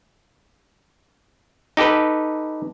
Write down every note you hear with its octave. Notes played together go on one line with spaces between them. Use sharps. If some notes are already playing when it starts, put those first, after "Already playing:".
D#4 G4 A4 B4